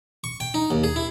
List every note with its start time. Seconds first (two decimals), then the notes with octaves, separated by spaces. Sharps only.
0.24 C#6
0.40 G5
0.54 D#4
0.71 D#2
0.84 G#4
0.96 E4